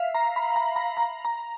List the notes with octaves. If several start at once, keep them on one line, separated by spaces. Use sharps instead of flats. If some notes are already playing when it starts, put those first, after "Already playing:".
Already playing: E5 F5
A#5
B5
A#5
A#5
A#5
A#5